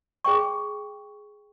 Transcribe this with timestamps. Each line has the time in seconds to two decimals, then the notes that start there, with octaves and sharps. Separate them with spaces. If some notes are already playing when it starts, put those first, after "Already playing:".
0.24 G#4 G5 C#6